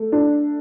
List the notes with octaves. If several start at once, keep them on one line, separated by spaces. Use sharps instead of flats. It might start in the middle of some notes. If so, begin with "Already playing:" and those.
Already playing: A3
D4